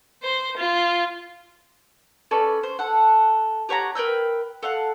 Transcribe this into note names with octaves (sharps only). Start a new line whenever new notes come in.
C5
F4
C#4 A4 B4 D5
C5
A4 F#5
G4 C#5 F#5 A#5
A#4 B4 G5 E6
A4 F5 F#5